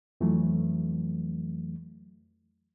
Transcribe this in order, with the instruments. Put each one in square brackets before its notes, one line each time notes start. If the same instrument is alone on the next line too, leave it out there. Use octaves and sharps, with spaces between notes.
[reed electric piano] F2 E3 F#3 A3